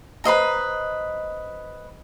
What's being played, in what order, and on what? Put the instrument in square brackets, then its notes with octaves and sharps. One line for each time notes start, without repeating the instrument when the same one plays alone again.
[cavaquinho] B4 C5 D#5 A#5